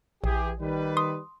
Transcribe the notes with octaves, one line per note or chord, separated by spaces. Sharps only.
A#1 E3 G4 G#4
D#3 G3 B4
C6 D#6